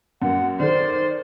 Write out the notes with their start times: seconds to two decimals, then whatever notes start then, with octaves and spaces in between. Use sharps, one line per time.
0.22 F#2 A#3 F#5
0.60 D#3 A4 C5 D5